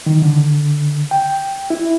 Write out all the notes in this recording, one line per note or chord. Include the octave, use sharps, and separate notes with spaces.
D#3
D3
G5
E4